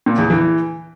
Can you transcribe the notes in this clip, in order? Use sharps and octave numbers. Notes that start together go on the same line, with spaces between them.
A#2
E2
E3